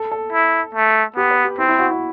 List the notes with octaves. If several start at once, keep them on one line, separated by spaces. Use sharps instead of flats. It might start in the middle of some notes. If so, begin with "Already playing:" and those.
Already playing: A4
A4
E4
A3
B3 G4
B4
G4
C4 E4
E4
F#4
E4